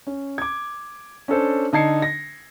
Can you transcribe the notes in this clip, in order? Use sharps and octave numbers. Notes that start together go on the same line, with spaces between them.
C#4
D6 G#6
C#4 D4 A4 C5
D3 D#4 A5 G#6 C7 C#7
A#6